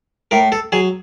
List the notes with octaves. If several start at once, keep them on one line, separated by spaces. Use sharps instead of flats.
A2 A#4
A4
F#3 G#4